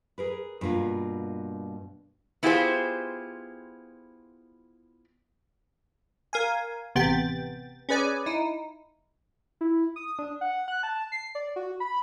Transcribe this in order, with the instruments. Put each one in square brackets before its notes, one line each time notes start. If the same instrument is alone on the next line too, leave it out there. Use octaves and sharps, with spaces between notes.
[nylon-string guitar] G#4 A#4 B4
G2 B2 A#3 F4
[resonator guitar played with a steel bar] B3 E4 F4 G4 G#4 C5
[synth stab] A#4 F5 G#5
A1 C3 B3 G5 A6
C#4 G#4 B4 D5 G#5
D#4 E4
[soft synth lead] E4
D#6
D4
F#5
F#6
A5
C7
D5
F#4
B5